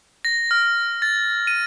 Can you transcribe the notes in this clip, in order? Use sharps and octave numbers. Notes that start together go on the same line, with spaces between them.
A#6
F6
A6
D#7